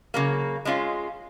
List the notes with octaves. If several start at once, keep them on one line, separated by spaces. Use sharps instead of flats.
C#3 F#3 A#3
G#3 C#4 F4